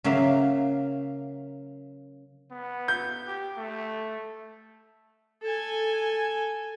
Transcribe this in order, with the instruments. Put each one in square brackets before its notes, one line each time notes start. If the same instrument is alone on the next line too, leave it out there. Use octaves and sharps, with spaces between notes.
[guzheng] C#3 F#3 A#3 E5 F5
[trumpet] B3
[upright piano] G6
[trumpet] G4
A3
[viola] A4 G#5